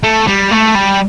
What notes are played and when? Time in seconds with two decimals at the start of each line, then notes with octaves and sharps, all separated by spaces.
0.03 A3
0.27 G3
0.52 A3
0.75 G3